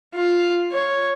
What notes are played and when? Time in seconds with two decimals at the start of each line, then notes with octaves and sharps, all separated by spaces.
0.15 F4
0.72 C#5